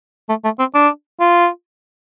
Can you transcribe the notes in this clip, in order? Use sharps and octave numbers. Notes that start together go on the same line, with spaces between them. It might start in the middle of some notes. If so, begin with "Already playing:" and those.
A3
A3
C4
D4
F4